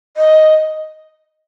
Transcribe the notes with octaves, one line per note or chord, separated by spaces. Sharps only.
D#5